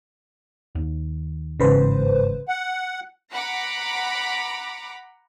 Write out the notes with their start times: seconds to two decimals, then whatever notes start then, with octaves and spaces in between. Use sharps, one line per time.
0.75 D#2
1.60 G1 G#2 C#3 E3 B4 C5
2.48 F#5
3.33 F#5 A#5 B5 D6